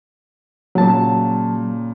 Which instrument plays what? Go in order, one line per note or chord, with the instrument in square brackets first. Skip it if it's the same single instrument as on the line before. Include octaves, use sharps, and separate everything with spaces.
[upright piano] A#2 C#3 [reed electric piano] F#3 A5